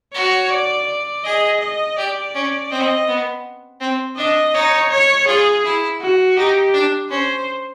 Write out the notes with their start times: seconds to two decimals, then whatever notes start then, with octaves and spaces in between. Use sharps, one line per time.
0.14 F#4 C#5
0.50 D5
0.88 D5
1.24 G#4 D#5
1.61 D#5
1.98 G4 D5
2.34 C#4
2.71 C4 D#5
3.08 B3
3.81 C4
4.17 D4 D#5
4.54 D#4 C#5
4.91 C#5
5.27 F4 G#4
5.64 E4
6.01 F#4
6.37 D#4 G4
6.74 D4
7.10 C#4 C5